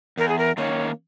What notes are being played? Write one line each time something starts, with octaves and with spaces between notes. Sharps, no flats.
E2 A#4
G#4
A#4
D#3 A#3 C#4 C#5